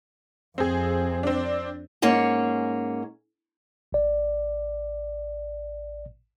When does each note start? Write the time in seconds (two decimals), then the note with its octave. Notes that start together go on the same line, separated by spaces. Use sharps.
0.58 F2 C4 G#4
1.23 C4 D4
2.02 G#2 A#3 C#4 G#4 C#5
3.93 A1 D5